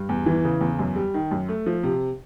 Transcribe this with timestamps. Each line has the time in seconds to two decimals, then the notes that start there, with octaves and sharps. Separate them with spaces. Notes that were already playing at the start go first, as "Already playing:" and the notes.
Already playing: G2
0.09 E2
0.26 E3
0.44 C#3
0.61 E2
0.79 F#2
0.96 G3
1.14 D#3
1.31 F#2
1.49 A3
1.66 F3
1.83 C3